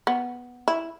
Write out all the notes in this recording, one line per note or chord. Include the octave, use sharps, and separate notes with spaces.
B3
E4